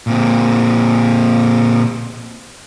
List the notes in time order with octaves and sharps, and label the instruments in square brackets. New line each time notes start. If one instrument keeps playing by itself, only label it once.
[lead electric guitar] A#2 C4